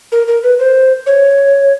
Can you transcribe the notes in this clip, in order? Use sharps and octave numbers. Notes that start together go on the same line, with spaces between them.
A#4
A#4
B4
C5
C#5